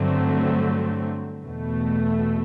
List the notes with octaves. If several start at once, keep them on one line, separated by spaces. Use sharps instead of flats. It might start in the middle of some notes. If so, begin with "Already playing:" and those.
Already playing: G2 D3 F#3 A3 C4
E2 B2 A3